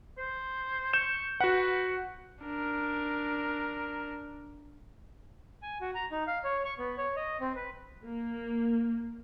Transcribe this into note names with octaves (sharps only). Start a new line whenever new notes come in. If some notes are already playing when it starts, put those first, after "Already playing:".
C5
C#6 G6 E7
F#4 B4 F#5
D4 A#4
G#5
F#4
A#5
D#4
F5
C#5
C#6
B3
C#5
D#5
C4
B4
A#3